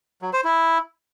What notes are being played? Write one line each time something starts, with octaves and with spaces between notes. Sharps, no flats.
F#3
C5
E4